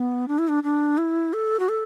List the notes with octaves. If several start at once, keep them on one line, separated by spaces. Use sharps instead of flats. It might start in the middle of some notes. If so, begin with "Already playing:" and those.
Already playing: B3
D4
E4
D4
D4
E4
A4
F#4
A4